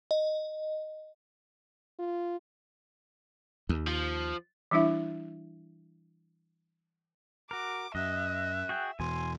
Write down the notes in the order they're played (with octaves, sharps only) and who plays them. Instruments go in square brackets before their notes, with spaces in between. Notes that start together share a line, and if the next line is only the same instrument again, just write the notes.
[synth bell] D#5
[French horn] F4
[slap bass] D#2
[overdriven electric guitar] F3
[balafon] E3 G3 D4 E4 E5
[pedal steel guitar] F#4 A#4 [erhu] D6
[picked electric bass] F#2 [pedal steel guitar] D#5 [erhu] E5 [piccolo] F#6
[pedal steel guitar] F#4 G#4 G5
[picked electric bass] E2 B2 [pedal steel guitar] G#5 [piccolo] C6